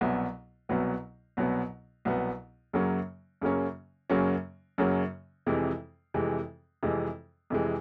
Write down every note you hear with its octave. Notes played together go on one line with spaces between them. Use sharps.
C2 B2 F#3 B3
C2 B2 F#3 B3
C2 B2 F#3 B3
C2 B2 F#3 B3
F#2 C#3 F#3 A#3 C#4
F#2 C#3 F#3 A#3 C#4
F#2 C#3 F#3 A#3 C#4
F#2 C#3 F#3 A#3 C#4
F2 C3 E3 G#3
F2 C3 E3 G#3
F2 C3 E3 G#3
F2 C3 E3 G#3